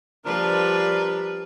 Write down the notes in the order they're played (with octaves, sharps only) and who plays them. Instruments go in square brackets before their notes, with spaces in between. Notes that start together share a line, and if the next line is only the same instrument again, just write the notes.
[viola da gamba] F3 G3 B4 [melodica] D4 A#4